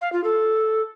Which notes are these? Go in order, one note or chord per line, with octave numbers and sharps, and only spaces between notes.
F5
F4
A4